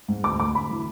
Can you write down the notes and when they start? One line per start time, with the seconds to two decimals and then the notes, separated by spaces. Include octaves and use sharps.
0.08 G#2
0.24 D2 D6
0.39 D2 D6
0.55 D2 B5
0.71 E3